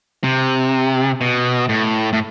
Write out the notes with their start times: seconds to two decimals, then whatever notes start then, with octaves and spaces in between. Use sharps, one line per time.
0.24 C3
1.21 B2
1.69 A2
2.13 A2